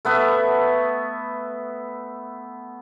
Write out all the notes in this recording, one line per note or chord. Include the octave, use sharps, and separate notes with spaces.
A3 B3 B4 E5